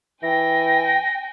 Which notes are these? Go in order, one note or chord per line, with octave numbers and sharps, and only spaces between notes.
E3 G5 G#5 A#6